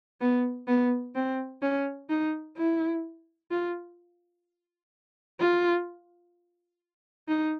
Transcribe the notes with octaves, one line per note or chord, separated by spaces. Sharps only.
B3
B3
C4
C#4
D#4
E4
F4
F4
D#4